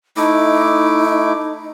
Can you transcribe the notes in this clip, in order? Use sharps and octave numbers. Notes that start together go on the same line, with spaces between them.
A3 D#4 E4 D6